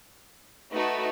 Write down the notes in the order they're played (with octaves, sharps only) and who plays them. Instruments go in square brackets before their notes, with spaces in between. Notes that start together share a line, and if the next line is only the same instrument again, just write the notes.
[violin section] A3 D#4 F#4 B4